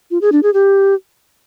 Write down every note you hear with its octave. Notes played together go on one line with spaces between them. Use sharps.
F4
G#4
D4
G#4
G4